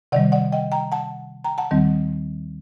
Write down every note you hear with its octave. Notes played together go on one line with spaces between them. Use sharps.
C3 D#3 G3 D5 F#5
D5 F#5
D#5 G5
G5 A#5
F#5 A5
G5 A#5
F#5 A5
D#2 D#3 G3 C4